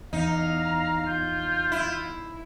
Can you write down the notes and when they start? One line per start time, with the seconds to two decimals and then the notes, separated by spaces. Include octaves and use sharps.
0.13 E2 D#4 F5 A#5
1.06 F4 G6
1.72 E4